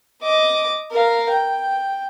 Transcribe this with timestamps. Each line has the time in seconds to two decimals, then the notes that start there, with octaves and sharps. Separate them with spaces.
0.22 D#5 D6
0.91 A#4 F5
1.30 G5